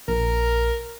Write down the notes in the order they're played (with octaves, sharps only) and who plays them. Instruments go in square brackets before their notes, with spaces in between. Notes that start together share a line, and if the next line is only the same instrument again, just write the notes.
[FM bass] A#1 [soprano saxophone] A#4